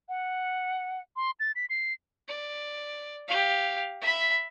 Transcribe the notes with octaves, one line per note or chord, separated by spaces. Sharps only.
F#5
C6
A6
B6
C7
D5
G4 F5
E5 B5